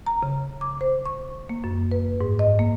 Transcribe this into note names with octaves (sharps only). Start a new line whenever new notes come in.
A#5
C#3
D6
C5
C#6
A#3
F#2
B4
G#2
D#5
A#3